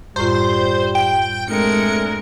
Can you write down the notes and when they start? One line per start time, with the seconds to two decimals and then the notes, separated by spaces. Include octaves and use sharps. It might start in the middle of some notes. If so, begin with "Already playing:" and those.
0.16 F#2 A2 G3 F4 C5
0.95 G5
1.48 G#3 A3 C4 D4 A#4 C#7